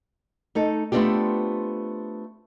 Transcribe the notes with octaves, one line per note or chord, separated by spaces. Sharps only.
A3 D#4 A4
A3 B3 C4 D4 F4 G4